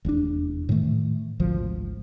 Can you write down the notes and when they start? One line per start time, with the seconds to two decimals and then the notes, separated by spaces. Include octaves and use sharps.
0.05 F1 E2 C3 D4
0.69 A2 D#3 E3 A3
1.40 G#1 D2 F3